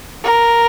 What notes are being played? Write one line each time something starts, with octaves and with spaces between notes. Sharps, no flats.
A#4